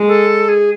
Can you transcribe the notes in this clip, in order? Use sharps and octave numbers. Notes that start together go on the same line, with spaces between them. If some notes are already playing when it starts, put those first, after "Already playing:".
Already playing: G#3
A4
G#4